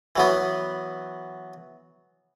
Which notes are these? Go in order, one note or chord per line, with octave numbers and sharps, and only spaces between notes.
E3 F#3 B3